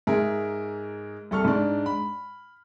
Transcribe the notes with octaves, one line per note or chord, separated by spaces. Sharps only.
G#2 G#4 A#4 E5
C2 A4 C#6 F6
G#2 D4
B5